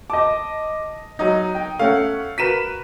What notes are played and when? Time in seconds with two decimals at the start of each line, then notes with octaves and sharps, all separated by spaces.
0.10 D#5 A5 D6
1.19 F#3 D#4 D#5
1.55 G5
1.79 A3 C#4 F5 F#5
2.38 F#4 A#4 B4 B6 D#7 E7